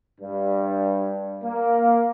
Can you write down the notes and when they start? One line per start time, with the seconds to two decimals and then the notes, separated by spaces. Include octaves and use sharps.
0.21 G2
1.44 A#3